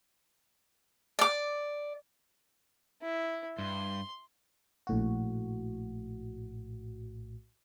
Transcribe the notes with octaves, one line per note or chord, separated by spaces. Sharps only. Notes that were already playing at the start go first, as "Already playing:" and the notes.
D5 D6
E4
G2 C6
A#1 A2 F#4